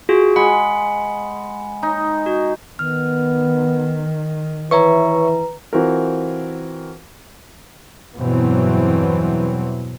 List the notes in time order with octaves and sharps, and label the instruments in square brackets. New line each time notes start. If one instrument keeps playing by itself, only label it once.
[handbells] F4 F#4 G#4
[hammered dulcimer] G#3 [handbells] F#5 B5
[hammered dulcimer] D#4
[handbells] F#4
[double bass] D#3 [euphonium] B3 [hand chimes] F6
[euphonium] E3 [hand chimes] B4 A#5 [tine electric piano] C#5 E5 C#6
[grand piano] E3 C4 F4 F#4 A#4
[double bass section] E2 G2 B2 E3 F#3 C4